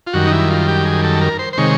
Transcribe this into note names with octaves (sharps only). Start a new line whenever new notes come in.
F4
F#2 D#3 G3 F#4
D#4
E4
F4
G4
G#4
A4
A#4
C5
C5
C3 D#3 G#3 C#5